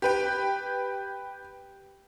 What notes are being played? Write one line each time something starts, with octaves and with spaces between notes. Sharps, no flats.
G4 B4 G5